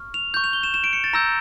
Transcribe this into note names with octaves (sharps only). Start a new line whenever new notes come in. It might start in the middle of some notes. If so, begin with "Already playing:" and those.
Already playing: C#6 F6
F7
C#6 G6
F7
G7
E7
E7
D7
C#7
A6
A#5 E6 G6 A#6